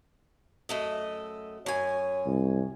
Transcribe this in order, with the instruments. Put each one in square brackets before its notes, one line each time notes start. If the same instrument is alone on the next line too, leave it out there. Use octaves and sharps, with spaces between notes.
[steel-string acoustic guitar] F#2 A3 D#5
[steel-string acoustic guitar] F#2 G#5 [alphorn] C#5
[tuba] C2